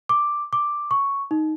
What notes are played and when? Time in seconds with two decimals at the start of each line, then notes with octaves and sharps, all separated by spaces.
0.09 D6
0.53 D6
0.91 C#6
1.31 D#4